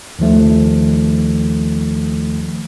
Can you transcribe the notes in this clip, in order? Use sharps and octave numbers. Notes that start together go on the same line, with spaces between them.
D#2 D#3 F3 A3